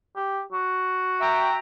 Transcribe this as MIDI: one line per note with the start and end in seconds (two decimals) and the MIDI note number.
0.16 0.41 67
0.52 1.59 66
1.21 1.55 76
1.21 1.55 79
1.21 1.55 82